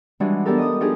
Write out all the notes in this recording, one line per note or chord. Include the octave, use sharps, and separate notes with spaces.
E3 G3 G#3 D4 F#4 G#4
B3 D4 E4 G4 A4 A#4
D#5 D#6
F3 D4 D#4 F4 G4 G#4